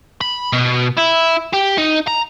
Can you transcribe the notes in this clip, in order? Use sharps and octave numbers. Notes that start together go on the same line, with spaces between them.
B5
B2
E4
G4
D#4
A#5